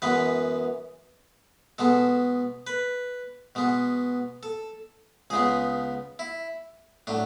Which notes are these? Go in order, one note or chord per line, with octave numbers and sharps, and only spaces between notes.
F#2 E3 G#3 B3 B4
B2 G#3 B3 A4
B4
B2 G#3 B3
A4
C#2 C#3 G#3 B3 G#4
E4
A2 F#3 D4